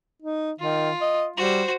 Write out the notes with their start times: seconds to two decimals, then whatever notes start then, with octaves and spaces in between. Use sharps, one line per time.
0.22 D#4
0.60 D#3 F4
1.01 D#5
1.37 G3 F#4 C5